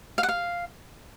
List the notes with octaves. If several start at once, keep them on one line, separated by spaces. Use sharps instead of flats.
F5
F#5
F5